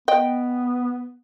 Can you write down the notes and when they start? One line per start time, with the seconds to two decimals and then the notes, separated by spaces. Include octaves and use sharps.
0.08 B3 D#5 G5